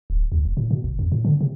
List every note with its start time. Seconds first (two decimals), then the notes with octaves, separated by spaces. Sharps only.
0.10 D1
0.32 D2
0.45 E1
0.57 A2
0.71 B2
0.84 G1
0.99 F2
1.12 A2
1.25 D3
1.41 C3